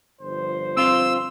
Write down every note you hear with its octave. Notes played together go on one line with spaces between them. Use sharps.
G1 F3 C5
C4 F4 E6